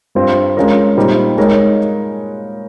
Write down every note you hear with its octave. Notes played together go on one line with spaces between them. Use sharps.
G2 G3 C4 F4
G#3 C#4 F4 A#4 C#5
A#2 G3 C4 D#4
G#3 D#4 A#4 C#5